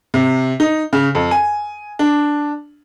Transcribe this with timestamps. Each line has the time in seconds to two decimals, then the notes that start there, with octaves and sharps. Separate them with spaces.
0.14 C3
0.60 D#4
0.93 C#3
1.15 F2
1.31 G#5
1.99 D4